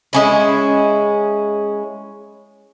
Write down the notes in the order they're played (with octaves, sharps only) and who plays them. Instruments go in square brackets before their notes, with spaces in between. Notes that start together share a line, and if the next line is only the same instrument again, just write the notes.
[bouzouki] G#3 C#4 E4